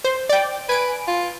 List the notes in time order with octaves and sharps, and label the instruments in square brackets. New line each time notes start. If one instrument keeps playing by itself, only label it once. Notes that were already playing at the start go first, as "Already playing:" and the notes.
[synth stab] C5
D5 G5
[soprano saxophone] B4 [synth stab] G#5 D7
[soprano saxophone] F4